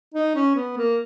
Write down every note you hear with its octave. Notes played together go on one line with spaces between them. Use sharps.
D#4
C#4
B3
A#3